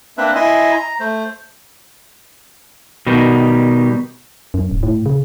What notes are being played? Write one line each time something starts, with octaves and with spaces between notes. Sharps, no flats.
A#3 C4 D4 B4 E5
E4 D#5 E5 G#5 C6
A#5
A3 C5
B2 D#3 G3
F#2
D1
A2
C#3